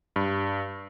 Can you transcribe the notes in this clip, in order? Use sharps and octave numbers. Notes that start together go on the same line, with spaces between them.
G2